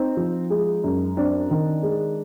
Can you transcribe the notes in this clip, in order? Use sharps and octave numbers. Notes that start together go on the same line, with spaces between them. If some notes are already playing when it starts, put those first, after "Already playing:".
Already playing: C4 D#4
F3
G#3
F#2
C4 D4
D#3
G#3